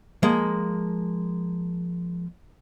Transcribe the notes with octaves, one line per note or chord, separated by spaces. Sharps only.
F3 G#3 A#3